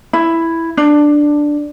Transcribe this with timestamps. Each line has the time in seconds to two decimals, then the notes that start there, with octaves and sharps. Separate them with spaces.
0.13 E4
0.77 D4